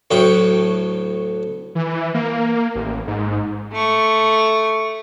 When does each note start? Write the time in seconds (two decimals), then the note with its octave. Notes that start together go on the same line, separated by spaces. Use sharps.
0.11 D2 A2 F#3 G5 D#6
1.75 E3
2.14 A#3
2.75 A1
3.07 G#2
3.73 A3 C#6